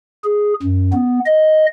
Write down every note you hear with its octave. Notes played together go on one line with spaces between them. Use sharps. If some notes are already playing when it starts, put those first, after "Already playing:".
G#4
F#2
B3
D#5